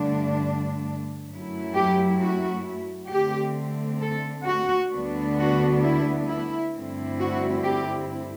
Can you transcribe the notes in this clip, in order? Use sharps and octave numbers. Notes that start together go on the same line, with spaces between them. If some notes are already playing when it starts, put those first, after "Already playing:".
Already playing: G2 D3 A3 D4
F#2 F#3 A3 E4
G4
F#4
D3 A3 C4 G4
A4
F#4
D2 D3 G3 B3 D4
F#4
E4
E4
G2 D3 A3 C4 E4
F#4
G4